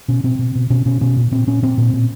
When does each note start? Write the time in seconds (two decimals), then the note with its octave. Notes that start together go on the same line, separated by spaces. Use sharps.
0.08 B2 C#4
0.24 B2 C4
0.39 B2
0.55 B2
0.70 B2 C#4
0.86 B2 C#4
1.01 B2 C#4
1.16 A#2
1.31 A#2 C4
1.47 A#2 C#4
1.62 A#2 C4
1.78 A#2
1.93 A#2